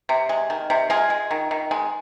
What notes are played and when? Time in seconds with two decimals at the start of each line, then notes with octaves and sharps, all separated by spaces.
0.09 C3
0.29 G#3
0.50 D#3
0.70 C3
0.90 G#3 F4 G#4
1.10 G#3
1.31 D#3
1.51 D#3
1.71 G#3